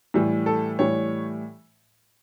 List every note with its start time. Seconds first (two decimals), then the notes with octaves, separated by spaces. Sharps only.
0.14 A2 E3 G3
0.46 A4
0.79 A2 E3 G3 C#5